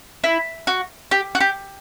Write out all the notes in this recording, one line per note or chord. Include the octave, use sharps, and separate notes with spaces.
E4
F#4
G4
F#4
G4